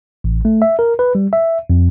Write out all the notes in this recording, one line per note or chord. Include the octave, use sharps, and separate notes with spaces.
A1
A3
E5
A#4
B4
G3
E5
F2